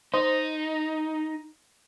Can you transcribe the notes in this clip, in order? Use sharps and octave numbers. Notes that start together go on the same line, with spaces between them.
D#4 C5 D#5